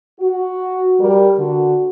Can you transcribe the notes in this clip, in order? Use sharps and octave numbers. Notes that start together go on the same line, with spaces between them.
F#4
G3 A#4
D3 F#4